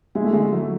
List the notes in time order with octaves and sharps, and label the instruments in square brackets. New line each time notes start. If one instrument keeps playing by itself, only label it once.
[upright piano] G#3 [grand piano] E4
[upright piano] A3
[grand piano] D3 [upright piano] G#3
[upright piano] F#3 [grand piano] A3